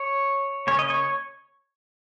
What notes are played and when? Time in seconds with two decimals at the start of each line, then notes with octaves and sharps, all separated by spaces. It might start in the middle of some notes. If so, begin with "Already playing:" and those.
Already playing: C#5
0.67 C#3 A#3 C#4 C#5
0.79 D#5
0.90 C#5